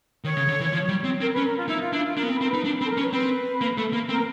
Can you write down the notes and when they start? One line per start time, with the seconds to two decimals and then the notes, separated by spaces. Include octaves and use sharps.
0.24 D#3 C#5
0.37 C#3
0.49 D3
0.61 E3
0.73 F3
0.89 G3
1.04 C4
1.21 C4 A#4
1.33 B4
1.37 C#4
1.45 A#4
1.57 F4
1.69 D#4 E4
1.81 F4
1.93 D4 E4
2.05 F4
2.17 D4 A#4
2.23 B3
2.29 C4
2.33 B4
2.41 C4
2.44 A#4
2.49 D#4 B4
2.65 D4
2.77 B4
2.81 C4
2.85 A4
2.89 A#4
2.97 C#4
3.01 B4
3.13 C4 B4
3.61 A#3
3.78 A3
3.93 A#3
4.09 C4 A#4